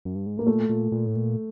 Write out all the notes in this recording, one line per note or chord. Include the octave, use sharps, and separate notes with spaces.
F#2
G2
G#2
A2 A#3
A#2 A3
A#2
A#2
A2
A#2